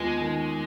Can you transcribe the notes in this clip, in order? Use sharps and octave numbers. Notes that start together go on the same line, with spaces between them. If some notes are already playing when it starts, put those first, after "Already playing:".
Already playing: D#2 G#3 B3 F4
D#3